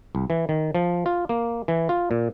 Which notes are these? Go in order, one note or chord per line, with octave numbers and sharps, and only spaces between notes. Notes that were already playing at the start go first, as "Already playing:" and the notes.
C2
E3
D#3
F3
F4
A#3
E3
F4
A#2